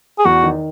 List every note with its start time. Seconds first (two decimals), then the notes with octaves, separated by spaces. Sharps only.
0.19 G#4
0.25 E2 F#4
0.43 D#3